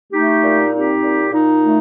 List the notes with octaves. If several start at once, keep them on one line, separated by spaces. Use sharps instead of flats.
A3 D#4 G4
A#2
C4 D#4 G4
A#2
A#2 D#4
A3